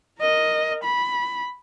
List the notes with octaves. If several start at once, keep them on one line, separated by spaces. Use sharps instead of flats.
A#4 D#5
B5